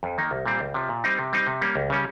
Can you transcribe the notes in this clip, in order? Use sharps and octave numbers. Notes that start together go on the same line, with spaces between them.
F2
D#3 A#3 D#4
C2
A#2 G3 C4
C#2
C3 F3
A#2
G3 C4 D#4
C3
G3 C4 D#4
C3
G3 A#3 C#4
C#2
C#3 G3 C#4